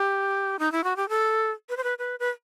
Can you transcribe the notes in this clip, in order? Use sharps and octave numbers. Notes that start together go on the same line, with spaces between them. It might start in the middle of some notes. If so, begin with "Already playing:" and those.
Already playing: G4
D#4
E4
F#4
G4
A4
B4
C5
B4
B4
B4